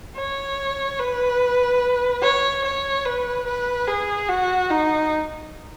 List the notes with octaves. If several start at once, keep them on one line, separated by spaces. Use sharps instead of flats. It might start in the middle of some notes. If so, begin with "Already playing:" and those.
C#5
B4
C#5
C#5
B4
B4
G#4
F#4
D#4